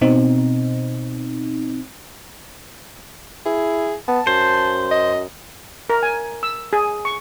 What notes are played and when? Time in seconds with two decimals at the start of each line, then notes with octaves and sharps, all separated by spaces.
0.01 B2 C4 D#4
3.46 E4 G#4
4.08 B3 A5
4.27 F#2 C5
4.91 D#5
5.90 A#4
6.03 G#5
6.43 E6
6.73 G#4
7.05 C#6